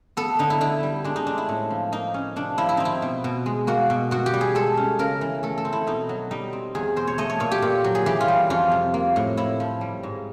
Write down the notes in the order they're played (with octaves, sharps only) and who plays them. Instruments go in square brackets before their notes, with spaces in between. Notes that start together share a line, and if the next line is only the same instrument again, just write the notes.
[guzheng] B3 A4
D3 D#4
E4
D3 E4
G3
G#3 D4
D#4
C4 D4
E4
A2
F3
A#3 D#4
C#4
C3 D4
F3 E4
E4
C4 D#4
E4
B2
B2
G#3
A#3 F#4
B2
B2 F#4
G4
G3
G#4
G#3 A4
C#4
C#3 A#4
E3
A3 A4
A4
C4
E4
B2 D#4
F#3
G3 D#4
C4
E2 G#4
B2 C5
C#5
A3 D#5
C#5
A#2 C#5
G4
A#2
F#3
G#4
E3 G4
F4
G3
F2 F4
C3
A#3
A2
A2 E4
F3
G3
G#2